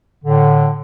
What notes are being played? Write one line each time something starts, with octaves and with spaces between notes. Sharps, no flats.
A2 D3